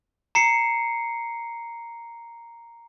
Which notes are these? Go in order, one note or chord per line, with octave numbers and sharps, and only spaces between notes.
A#5 C7 C#7